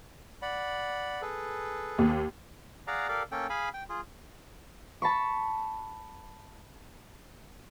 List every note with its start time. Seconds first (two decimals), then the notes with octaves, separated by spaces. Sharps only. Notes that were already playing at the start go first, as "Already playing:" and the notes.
0.42 D5 F#5 B5
1.22 G#4 A4 B4
1.98 D#2
2.87 G#4 D5 F5 F#5 A#5
3.09 G4 A4 A#4 D5 F5
3.32 A#3 C#4 A4 G5
3.50 G#4 F5 G#5 B5
3.74 G5
3.89 F4 G#4
5.02 A5 B5 C#6